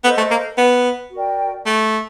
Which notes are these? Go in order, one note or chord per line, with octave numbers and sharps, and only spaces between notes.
B3 A4 C5 D#5
A3
A#3
B3
F#4 A#4 D5 G5
A3